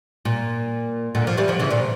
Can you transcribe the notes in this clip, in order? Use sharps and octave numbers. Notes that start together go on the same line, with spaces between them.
A#2
A#2 D3
F3
E3 G3
D3 F3
C#3 E3
A#2 D3